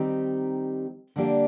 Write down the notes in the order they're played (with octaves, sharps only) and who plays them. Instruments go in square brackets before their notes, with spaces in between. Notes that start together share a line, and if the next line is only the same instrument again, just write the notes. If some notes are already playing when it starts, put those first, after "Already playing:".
Already playing: [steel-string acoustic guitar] D#3 G3 C4 D#4 G4
D3 G3 A#3 D4 G4